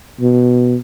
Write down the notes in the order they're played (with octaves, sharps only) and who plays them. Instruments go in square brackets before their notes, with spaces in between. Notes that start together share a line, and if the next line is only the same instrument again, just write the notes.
[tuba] B2